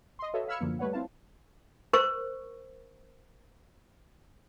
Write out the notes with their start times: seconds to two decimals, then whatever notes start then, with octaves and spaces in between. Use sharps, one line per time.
0.19 D#5 C6
0.34 F#4 A4 B4 C#5 D#5 E5
0.48 F5 B5 E6 F6 G#6 C#7
0.61 F#2 A2 D3 F3 A#3
0.79 G3 A3 B4 C#5 F#5
0.93 C4 E4 F4 F5 A5
1.93 A#4 C5 C#6